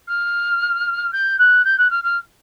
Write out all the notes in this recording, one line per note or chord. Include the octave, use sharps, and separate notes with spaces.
F6
G6
F#6
G6
F#6
F6
F6